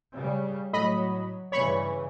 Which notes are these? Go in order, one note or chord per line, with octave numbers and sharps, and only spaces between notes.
C#3 G3
A2 F#3 D#5 B5
G2 C#3 E3 C#5 B5 C#6